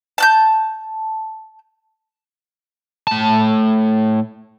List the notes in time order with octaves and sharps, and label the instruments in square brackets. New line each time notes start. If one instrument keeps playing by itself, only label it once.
[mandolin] A5 F#6 G6
[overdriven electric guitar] A2 A5